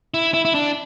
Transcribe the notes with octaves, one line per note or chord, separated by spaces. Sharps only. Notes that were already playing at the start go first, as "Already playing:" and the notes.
E4
E4
E4
D4